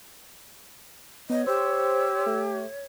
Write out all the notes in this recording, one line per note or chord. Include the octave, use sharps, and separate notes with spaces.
B3 C#5 D#5
G4 C5 E6
A3